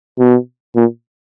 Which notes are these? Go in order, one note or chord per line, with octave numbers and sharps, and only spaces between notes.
B2
A#2